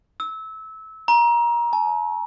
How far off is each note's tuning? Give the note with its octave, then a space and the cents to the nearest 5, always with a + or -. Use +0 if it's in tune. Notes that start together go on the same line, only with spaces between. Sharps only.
E6 -20
A#5 +25
A5 -45